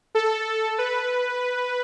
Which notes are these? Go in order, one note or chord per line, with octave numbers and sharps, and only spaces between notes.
A4
B4